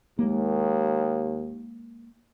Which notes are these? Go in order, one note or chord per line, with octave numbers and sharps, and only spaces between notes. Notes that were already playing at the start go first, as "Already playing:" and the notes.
D#2 G#3 A#3